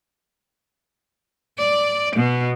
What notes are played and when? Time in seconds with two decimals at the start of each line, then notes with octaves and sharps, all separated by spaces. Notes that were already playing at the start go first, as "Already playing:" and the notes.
1.57 D5
2.14 B2